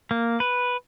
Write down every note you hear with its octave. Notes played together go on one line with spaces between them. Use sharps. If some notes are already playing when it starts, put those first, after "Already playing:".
A#3
B4